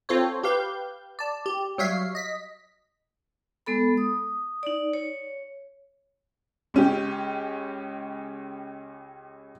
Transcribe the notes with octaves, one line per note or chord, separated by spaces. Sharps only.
C4 F4 A4 C5 C#5
G4 B4 F5 G6
D5 A5
G4
F#3 G3 C#5 E5 F5 C7
D#5 B6
G#3 B3 A4 B5
D#6
D#4 D5
C#5
C#2 C#4 G4